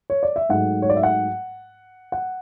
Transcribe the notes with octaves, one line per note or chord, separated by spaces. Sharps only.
C#5
D5
E5
G#2 F#3 A3 F#5
C#5
D5
E5
F#5
F#5